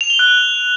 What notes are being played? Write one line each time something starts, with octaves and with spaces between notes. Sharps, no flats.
F7
G7
F#6